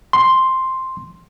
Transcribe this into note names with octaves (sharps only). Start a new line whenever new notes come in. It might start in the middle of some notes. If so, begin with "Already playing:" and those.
C6